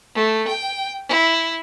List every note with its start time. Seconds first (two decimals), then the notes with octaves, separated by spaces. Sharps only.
0.15 A3
0.48 G5
1.09 E4